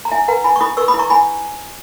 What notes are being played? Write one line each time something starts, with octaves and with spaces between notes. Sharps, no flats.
A#5
E4 E5 G#5
B4 F#5 A#5
E4 G#5 B5
C#6
E4 B5 D#6
B4 C#6 E6
B5 D#6
E4
A#5 C#6
E4 G#5 B5